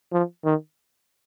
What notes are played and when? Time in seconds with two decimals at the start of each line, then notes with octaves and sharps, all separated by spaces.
0.13 F3
0.45 D#3